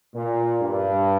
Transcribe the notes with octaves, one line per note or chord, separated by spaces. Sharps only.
A#2
G2